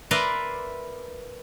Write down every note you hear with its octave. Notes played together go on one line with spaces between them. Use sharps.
A#4 B4 D5 E5 A#5 C6